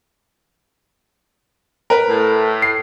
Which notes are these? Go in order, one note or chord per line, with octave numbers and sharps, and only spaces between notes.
A#4 B4
A2
C7